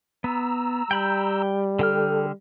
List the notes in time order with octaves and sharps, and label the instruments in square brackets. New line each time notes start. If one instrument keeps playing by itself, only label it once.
[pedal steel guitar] B3 [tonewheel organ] A#5 E6
[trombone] G3 [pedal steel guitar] G5 B5 G6
[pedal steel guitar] D3 G5 F6 [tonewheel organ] A4